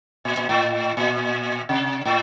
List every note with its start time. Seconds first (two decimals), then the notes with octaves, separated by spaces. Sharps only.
0.25 A#2
0.37 A#2
0.49 A2
0.97 A#2
1.69 C3
2.05 A2